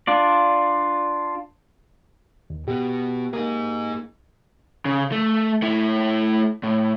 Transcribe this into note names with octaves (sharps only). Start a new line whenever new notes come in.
D4 F4 D5
D#2
B2 B3 G4
A#3 D#4 G#4
C#3
A3
A3 E4
A2